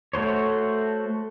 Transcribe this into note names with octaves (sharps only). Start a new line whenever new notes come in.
A3 F#4 C5 C#5